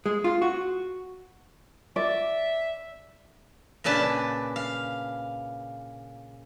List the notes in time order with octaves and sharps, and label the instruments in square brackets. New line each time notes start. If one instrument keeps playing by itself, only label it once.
[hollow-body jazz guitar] G#3
F4
F#4
[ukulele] D5 [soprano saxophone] E5
[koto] A#2 C#3 D4 B4 A5
F5